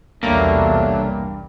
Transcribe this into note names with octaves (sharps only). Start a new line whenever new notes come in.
B1 E2 G2 C3 F#3 A3 A#3 D4